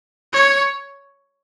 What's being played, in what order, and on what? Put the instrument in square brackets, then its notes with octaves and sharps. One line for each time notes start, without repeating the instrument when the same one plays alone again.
[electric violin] C#5